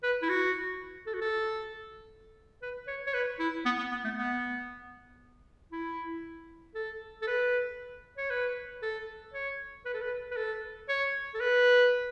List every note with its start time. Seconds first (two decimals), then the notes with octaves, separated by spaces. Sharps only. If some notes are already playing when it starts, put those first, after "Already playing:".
0.03 B4
0.22 E4
0.29 F#4
1.06 A4
1.14 F#4
1.21 A4
2.62 B4
2.87 C#5
3.07 C#5
3.14 B4
3.39 E4
3.65 B3
3.78 B3
3.91 B3
4.04 A3
4.17 B3
5.72 E4
6.75 A4
7.22 A4
7.27 B4
8.17 C#5
8.30 B4
8.82 A4
9.34 C#5
9.85 B4
9.94 A4
10.01 B4
10.31 B4
10.36 A4
10.89 C#5
11.34 A4
11.40 B4